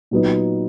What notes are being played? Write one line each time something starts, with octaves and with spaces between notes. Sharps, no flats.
A#2 F#3 B3 D#4